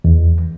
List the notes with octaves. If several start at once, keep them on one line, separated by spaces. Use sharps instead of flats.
E2